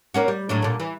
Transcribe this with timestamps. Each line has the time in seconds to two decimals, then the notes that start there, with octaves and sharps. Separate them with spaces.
0.14 A#3 C#4 F#4
0.28 G3
0.49 A2 F#3 D4
0.62 A#2 D3
0.80 E3